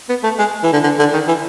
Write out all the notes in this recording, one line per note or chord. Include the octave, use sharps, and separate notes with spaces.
B3
A3
G#3
E3
D3
D3
D3
D#3
E3